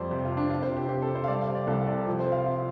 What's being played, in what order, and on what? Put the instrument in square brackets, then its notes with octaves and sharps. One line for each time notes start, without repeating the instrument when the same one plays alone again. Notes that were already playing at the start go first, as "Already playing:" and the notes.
Already playing: [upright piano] F2 G3 C5 D5
C3 G4
F4
C3
D4
C4 F4
C5
C3
G4
C4 G4
A4
C3
C5
F5
G3 D5
F5
C3
D5
C2 A4
C3 D5
F3
C5
C4
F5
F3 F5